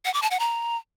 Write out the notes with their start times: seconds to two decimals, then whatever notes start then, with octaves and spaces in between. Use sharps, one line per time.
0.05 F#5
0.14 D6
0.22 A5
0.31 F#5
0.39 A#5